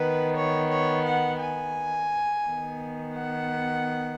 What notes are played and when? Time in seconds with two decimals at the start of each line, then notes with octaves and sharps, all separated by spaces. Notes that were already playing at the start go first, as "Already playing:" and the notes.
Already playing: D#3 B3 B4
0.36 C#5
0.71 C#5
1.06 F#5
1.41 G#5
2.45 D#3 B3
3.15 F#5